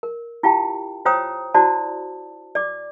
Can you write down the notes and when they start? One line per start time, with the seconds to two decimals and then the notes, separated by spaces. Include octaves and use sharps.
0.03 A#4
0.43 E4 F4 G4 F5 G5 A5
1.06 F4 C5 C#5 G5 A#5 D#6
1.54 E4 F#4 C5 D5 A5
2.55 D5 D6